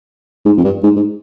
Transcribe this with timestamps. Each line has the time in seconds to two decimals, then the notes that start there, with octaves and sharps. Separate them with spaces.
0.45 G#2
0.57 F2
0.64 G2
0.83 G#2
0.96 G#2